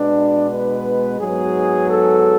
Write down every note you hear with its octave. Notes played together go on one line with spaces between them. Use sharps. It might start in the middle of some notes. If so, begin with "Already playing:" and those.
Already playing: B2 G#3 B3 D4
B4
G#2 F#3 B3 G#4
A4